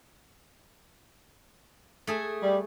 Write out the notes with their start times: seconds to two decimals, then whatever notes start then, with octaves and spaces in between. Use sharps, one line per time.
2.07 A3 G#4 E5
2.42 G3